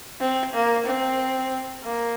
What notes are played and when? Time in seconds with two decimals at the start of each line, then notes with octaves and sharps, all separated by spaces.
0.20 C4
0.54 A#3
0.86 C4
1.83 A#3